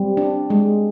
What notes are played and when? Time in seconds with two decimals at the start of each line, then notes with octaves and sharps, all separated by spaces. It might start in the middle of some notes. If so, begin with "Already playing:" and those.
Already playing: G3 C4
0.17 D4
0.50 G#3